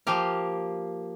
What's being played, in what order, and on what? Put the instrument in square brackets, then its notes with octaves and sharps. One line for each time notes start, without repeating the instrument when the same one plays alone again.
[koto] F3 A#3 G4 F5